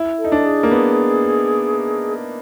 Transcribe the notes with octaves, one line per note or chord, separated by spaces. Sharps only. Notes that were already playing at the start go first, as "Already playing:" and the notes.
Already playing: E4
A4
D#4
D4
G#4
A#3
B3